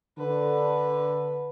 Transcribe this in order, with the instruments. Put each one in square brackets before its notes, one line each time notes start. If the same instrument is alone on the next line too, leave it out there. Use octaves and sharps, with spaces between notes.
[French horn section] D3 [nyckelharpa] B4